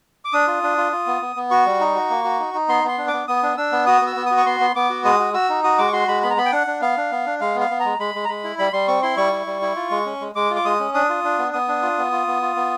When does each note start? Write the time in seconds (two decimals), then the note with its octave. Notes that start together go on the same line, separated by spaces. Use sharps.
0.25 D6
0.33 D4 D#6
0.47 F4
0.63 D4
0.77 F4
0.92 F4
1.07 B3
1.22 B3
1.36 B3
1.51 F#4 C#6
1.66 G3
1.80 D#4
1.95 F#4
2.10 A#3
2.24 F#4
2.39 D#4
2.54 D#4
2.69 B3 C6
2.84 B3 C6
2.98 D4
3.08 D6
3.13 B3
3.28 B3 D#6
3.43 D4
3.57 D4 E6
3.72 B3
3.86 F#4 D#6
4.01 B3
4.07 E6
4.16 B3
4.26 F#4 D#6
4.37 C#6
4.46 B3 C6
4.60 B3
4.76 B3 D6
4.90 F#4
5.04 G#3 D#6
5.20 F#4
5.34 F#4 E6
5.49 D#4
5.64 F#4 D#6
5.78 G#3 D6
5.88 C#6
5.93 F#4 C6
6.08 G#3 B5
6.23 B3 B5
6.30 A#5
6.37 B3 B5
6.45 G5
6.52 D4 F#5
6.67 D4
6.81 B3 F5
6.97 D4
7.11 B3
7.26 D4
7.40 G#3 F5
7.55 B3
7.60 F5
7.71 B3
7.80 A#5
7.85 G#3
7.99 G#3 B5
8.15 G#3
8.25 A#5
8.29 G#3 B5
8.44 E4
8.59 G3 B5
8.73 G3 C6
8.88 C4 C#6
9.02 E4 C6
9.17 G3 C#6
9.32 E4
9.47 G3
9.62 E4
9.76 F4
9.91 G#3
10.06 C#4
10.21 G#3
10.35 G#3 D6
10.50 F4
10.56 D6
10.65 G#3 D#6
10.80 C#4
10.94 D4 D#6
11.09 F4
11.24 D4
11.38 B3
11.53 B3 D#6
11.68 D4
11.82 F4
11.98 B3
12.12 F4
12.27 B3
12.42 F4
12.56 B3